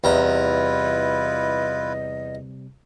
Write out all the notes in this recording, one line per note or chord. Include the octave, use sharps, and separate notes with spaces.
E2 C3 G3 E4 F4 B4 D#5 A#5